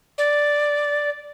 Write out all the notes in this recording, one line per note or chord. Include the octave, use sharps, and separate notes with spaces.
D5